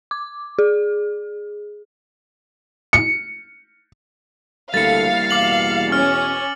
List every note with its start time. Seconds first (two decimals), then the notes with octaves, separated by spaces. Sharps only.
0.11 D6
0.59 G#4
2.93 C#7
4.74 D2 G3 A#3 E4 A4 F5 A6 C#7
5.31 E2 B2 D6 F#7
5.92 C#4 F6